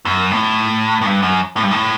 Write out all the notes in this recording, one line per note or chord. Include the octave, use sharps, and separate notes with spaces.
F#2
A2
A2
G2
F#2
A2
G2
A2